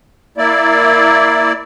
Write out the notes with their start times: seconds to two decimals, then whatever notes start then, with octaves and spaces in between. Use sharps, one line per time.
0.38 A#3 E4 D5